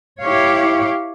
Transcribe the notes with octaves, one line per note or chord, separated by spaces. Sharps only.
E4 G4 C#5 F5